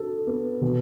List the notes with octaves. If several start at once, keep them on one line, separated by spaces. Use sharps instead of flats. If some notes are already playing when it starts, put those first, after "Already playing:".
Already playing: F#4 A4
B3
B2